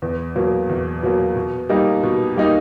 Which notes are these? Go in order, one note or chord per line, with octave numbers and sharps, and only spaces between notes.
E2
B2 F#3 A#3
E2
B2 F#3 A#3
B2
G3 A#3 D#4
B2
G3 A#3 D#4